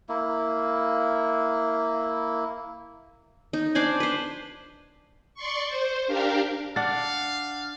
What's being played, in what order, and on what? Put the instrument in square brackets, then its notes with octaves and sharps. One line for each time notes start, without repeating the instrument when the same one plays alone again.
[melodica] A#3 E4
[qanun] D#4
D4 C5 D5 G#5
B4 C5
[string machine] D5 C6 C#6
C5
D4 G4 A#4 F5
[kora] D4 [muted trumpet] F5 [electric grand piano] F#5 A6